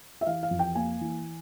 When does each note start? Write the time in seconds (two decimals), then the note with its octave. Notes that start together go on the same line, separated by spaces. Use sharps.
0.21 E5
0.26 E3 F5
0.43 F5
0.51 F2
0.59 G5
0.75 A#3 G#5
1.01 E3